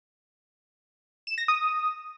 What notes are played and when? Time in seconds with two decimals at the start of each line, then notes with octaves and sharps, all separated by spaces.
1.27 E7
1.38 A#6
1.48 D#6